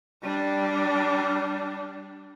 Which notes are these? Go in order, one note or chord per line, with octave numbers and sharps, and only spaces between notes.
G3 D4